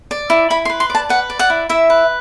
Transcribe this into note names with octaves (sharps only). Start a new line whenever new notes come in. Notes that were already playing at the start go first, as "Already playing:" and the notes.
D5
E4
E4 B5
C6
B4
C6
D5 A5
B4 F#5
D5
F#5
E4
E4 E5
B4